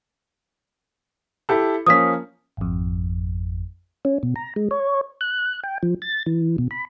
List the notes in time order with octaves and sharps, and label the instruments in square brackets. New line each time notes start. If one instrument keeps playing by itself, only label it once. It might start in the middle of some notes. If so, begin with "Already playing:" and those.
[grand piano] E4 G4 A4
[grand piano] F3 A#3 C#4 [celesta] D#6 B6
[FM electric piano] G#1 F2
[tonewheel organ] C#4
B2
A#5
G#3
C#5
F#6
G5
F3
A6
E3
B2
B5